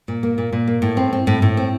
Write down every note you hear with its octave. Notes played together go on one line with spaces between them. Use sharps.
A#2
A#3
A#2
A#2
A#3
A2
C4
C4
A2
A2
C4